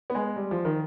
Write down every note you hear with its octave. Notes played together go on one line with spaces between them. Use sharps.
B3
G#3
G3
F3
D#3